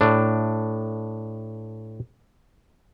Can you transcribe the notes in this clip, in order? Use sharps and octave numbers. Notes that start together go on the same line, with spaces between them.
A2 D4